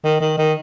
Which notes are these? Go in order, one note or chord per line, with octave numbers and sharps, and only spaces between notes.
D#3
D#3
D#3